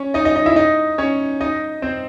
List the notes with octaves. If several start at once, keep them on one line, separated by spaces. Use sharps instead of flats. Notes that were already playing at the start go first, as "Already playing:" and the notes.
Already playing: C#4 C#5
D#4 D#5
D#4 D#5
D#4 D#5
E4 E5
D#4 D#5
C#4 C#5
D#4 D#5
C4 C5